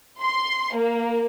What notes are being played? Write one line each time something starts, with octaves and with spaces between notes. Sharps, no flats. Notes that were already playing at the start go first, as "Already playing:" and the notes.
C6
A#3